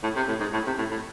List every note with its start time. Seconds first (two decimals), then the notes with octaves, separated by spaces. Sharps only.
0.03 A2
0.16 C3
0.28 A2
0.40 G#2
0.53 A2
0.66 C3
0.78 A2
0.91 A2